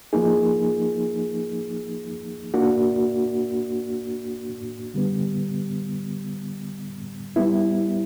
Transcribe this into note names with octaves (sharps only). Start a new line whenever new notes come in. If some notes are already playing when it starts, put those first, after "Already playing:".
F3 A#3 D#4 G#4
A#3 D4 F#4
D3 G3 B3
G3 B3 E4